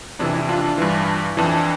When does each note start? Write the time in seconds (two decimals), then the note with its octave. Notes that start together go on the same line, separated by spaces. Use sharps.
0.19 F2 C3 E3 D4
0.34 E4
0.49 D4 F4
0.78 G2 E3
1.37 F2 E3 D4